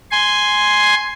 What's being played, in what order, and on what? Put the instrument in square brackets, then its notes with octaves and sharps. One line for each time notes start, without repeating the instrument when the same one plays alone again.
[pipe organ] G#5 C6